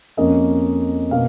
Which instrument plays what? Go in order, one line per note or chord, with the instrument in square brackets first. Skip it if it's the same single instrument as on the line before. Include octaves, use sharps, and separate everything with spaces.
[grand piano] F2 F3 A#3 C#4 D#5
B2 A#3 F5